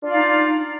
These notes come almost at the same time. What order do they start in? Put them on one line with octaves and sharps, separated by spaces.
D4 F4 D5 F5 D#4